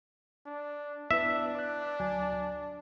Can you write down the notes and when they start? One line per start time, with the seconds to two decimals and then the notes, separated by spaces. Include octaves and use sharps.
0.46 D4
1.11 B3 D4 E4 B4 E5
1.55 D6 F#6
2.00 D2 F#3 G#5